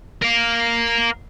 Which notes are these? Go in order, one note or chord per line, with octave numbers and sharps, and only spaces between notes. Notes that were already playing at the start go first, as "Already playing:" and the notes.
A#4 F5